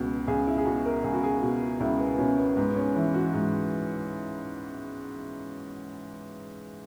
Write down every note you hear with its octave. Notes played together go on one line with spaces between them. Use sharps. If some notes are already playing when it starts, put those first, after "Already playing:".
Already playing: C#2 B2
C#2 G#4
E4
G#4
B2 F#4
A#4
C#2 G#4
F#4
G#4
B2
C#2 E4
B3
B2 C#4
B3
G#2 B3
C#4
E3 E4
F#4
G#2